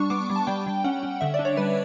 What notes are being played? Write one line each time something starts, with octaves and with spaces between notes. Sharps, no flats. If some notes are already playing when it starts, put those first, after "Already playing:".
Already playing: G3 D4 C#6
B3 D6
G3
A5
G3 G5
G3
C#4 F#5
C#4
D3 E5
D5
D4
C#5
G3 B4